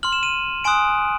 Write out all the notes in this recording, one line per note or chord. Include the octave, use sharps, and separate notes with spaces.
C6 F6 F#7
E7
D#7
G#5 C6 D#6 F#6 D7